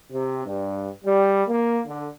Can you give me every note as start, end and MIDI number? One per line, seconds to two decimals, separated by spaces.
0.11 0.45 48
0.45 0.89 43
1.04 1.43 55
1.47 1.80 58
1.86 2.07 50